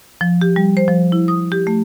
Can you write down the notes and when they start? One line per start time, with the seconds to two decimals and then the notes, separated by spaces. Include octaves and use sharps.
0.21 F3
0.41 G4
0.56 G3
0.77 C5
0.88 F3
1.12 E4
1.28 D#6
1.52 G4
1.67 A3